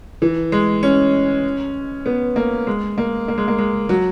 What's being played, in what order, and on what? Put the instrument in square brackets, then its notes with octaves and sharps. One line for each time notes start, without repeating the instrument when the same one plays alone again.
[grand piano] E3
G#3
C#4
B3
A#3
G#3
A#3
A#3
G#3
A#3
G#3
F#3